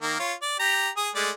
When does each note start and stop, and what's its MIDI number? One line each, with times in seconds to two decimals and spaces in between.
0.01 0.19 51
0.01 0.19 58
0.19 0.33 65
0.19 0.33 73
0.42 0.58 74
0.59 0.89 67
0.59 0.89 82
0.97 1.10 68
0.97 1.10 87
1.15 1.30 56
1.15 1.30 57
1.15 1.30 74